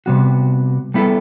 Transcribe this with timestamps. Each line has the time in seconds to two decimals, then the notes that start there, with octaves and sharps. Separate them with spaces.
0.06 C3 G3 B3 F#4
0.94 G3 B3 E4 A4